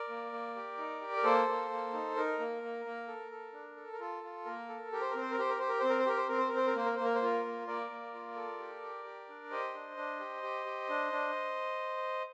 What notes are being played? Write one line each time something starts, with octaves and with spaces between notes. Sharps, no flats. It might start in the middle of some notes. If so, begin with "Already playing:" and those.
Already playing: A#4 D5
A#3
A#3
G4
D#4
G4
A#4
A#3 A4 C5
A#3
A#3
D#4
D#4 A#4
A#3
A#3
A#3
A4
A4
D4
A4
A#4
F4 A4
F4
A#3 A#4
A4
G4 A#4
C5
C4 A#4
C5
A#4
G4 C5
A#4
G4 C5
A#4
C4 C5
A#4
C5
G4 A#4
C5
C4 A#4
C5
A#4
C4 C5
A#4
A#3 C5
A#4
A#3 C5
A#4
C5
F4 A#4
A#3
A#3 A#4 D5
A#3
F4
A4
G4
G4
G4
D4
G4 C5 D#5
D4
D4
G4
G4
G4
D4
D4